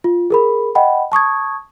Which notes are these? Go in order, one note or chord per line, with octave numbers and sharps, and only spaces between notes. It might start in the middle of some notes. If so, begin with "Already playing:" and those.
F4
G#4 A#4 B5
D#5 F#5 G5 B5
A5 C#6 D#6 G#6